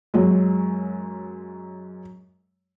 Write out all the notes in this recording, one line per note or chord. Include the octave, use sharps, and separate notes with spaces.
F#2 F#3 G#3